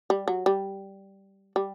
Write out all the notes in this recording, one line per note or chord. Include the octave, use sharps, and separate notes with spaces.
G3
F#3
G3
G3